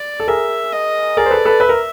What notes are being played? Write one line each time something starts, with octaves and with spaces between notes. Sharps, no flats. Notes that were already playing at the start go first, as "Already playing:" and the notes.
Already playing: D5
A4
G#4 A#4 E5
D#5
G#4 A#4 D5
C5
A4 B4
A4 B4
B4 E5
A#4